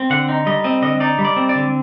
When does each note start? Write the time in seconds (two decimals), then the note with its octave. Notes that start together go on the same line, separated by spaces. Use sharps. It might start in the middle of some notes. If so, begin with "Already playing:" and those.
Already playing: C4
0.10 D3 F#5
0.29 D#4
0.46 G3 D#5
0.64 C4 D#5
0.82 D3 D#5
1.00 D#4 D5
1.19 G3
1.25 D5
1.36 C4
1.49 D5
1.55 D3